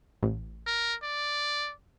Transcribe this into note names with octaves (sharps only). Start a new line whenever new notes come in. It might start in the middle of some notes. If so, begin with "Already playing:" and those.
A1
A#4
D5